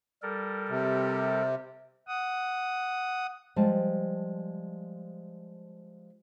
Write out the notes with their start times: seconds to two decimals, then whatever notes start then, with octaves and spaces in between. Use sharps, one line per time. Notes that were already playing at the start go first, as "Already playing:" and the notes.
0.22 G3 A4 A#4
0.69 C3
2.08 F#5 D#6
3.56 F3 G3 G#3 A5